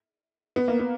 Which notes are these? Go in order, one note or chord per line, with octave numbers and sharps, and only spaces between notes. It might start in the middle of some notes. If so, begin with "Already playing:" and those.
B3
A#3
B3